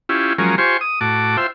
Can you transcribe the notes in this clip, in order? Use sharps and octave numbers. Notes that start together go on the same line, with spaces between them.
C#4 E4 F4 G4
F3 F#3 G#3 C#4 A#4
F4 G4 C5 G#5 C#6
D#6
A2 F#4 A5 D6
F4 C5 E5 G5